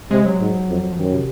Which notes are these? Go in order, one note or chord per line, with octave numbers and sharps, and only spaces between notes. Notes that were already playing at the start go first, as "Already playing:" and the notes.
C3 G#3
F#3
G#2
F2
F3
F#2 D#3
C3